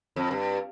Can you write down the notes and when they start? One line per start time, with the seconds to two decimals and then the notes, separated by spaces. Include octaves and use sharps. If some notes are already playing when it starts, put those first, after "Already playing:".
0.16 F2
0.31 G2